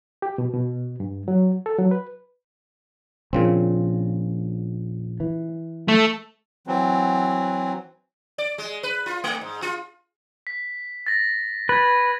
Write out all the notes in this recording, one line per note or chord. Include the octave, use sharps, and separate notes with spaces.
G4
B2
B2
G2
F#3
A4
F#3
B4
A#1 A#2 C#3 C4
E3
A3
E3 F#3 C4
D5
G#3
B4
F4
A3
G#2
F4
B6
A6 A#6
B4 G#6 A6